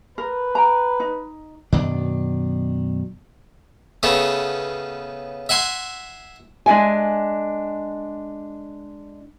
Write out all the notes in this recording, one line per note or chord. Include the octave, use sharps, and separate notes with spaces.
A#4 B4
G5 A#5
D#4
F#2 B2 D#3 D4
C#3 A3 B3 C#4
E5 F#5 G#5 C6
G#3 D4 E5 G#5